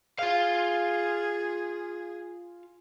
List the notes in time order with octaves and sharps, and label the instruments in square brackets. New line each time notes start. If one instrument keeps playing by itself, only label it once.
[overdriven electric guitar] F4 F5 [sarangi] G#4